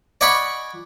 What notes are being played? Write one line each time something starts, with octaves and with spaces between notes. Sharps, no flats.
D5 D#5 F#5 G#5 B5 C#6